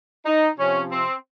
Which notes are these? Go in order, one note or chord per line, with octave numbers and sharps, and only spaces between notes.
D#4
C3 F3 C#4
C4